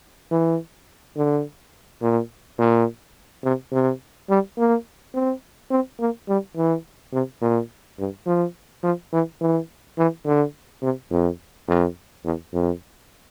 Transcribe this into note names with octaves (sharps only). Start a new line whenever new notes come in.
E3
D3
A#2
A#2
C3
C3
G3
A#3
C4
C4
A#3
G3
E3
C3
A#2
G2
F3
F3
E3
E3
E3
D3
C3
F2
F2
E2
F2